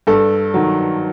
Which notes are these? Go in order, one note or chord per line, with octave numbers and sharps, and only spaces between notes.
G2 A4
D#3 F#3